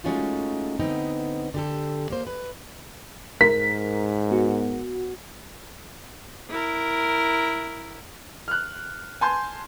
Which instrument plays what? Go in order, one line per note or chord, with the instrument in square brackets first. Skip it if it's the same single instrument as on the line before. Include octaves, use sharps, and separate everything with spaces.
[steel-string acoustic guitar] G#3 A3 C#4 D#4 F4 F#4
D3 B3 C4 D#4
D3 G4 A4
A#3 C5
B4
[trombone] G#2 [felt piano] A#4 [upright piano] B6
[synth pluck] B3 F#4
[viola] E4 A#4
[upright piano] F6 F#6
G#5 A5 C6 G6